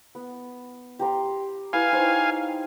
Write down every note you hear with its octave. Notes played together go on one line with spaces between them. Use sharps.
B3
G4 A#5 C6
E4 B4 F5 G#5
D#4 C5 C#5